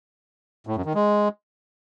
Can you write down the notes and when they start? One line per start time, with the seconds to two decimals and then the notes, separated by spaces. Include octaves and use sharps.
0.67 A2
0.76 F#2
0.85 D#3
0.95 G#3